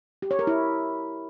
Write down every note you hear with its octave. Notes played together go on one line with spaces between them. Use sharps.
G4
C#5
A#4
E4